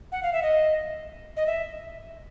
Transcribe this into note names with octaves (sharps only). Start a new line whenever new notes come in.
F#5
F5
E5
D#5
D#5
E5